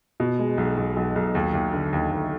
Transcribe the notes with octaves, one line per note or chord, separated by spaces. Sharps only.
B2
G#3
B1
B1
B1
B1
D#2
D#2
D3
D#2
D#2